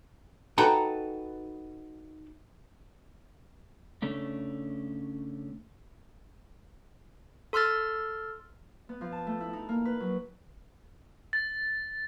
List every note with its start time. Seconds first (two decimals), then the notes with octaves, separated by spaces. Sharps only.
0.58 D#4 F#4 A4 B4 G5 A#5
4.02 C#3 A3 C#4 D4
7.53 A4 C6 E6 F6 A6
8.89 B3
9.01 F3
9.12 A5
9.27 A3
9.41 E4
9.53 D#4
9.69 A#3
9.85 B4
10.00 F#3
11.33 A6